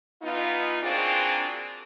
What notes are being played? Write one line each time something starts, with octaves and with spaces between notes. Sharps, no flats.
E3 B3 D#4 F4
A#3 C4 D4 F4 F#4 G#4